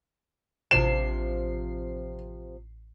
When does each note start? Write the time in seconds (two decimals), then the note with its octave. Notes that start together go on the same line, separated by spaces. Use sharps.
0.71 A1 C3 F3 D4 C7 E7